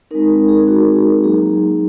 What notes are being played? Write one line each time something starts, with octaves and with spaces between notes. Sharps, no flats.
G#3 C4 D#4 A#4
A#4
G#4
F#4
G#4
F#3 A#3 D#4 G#4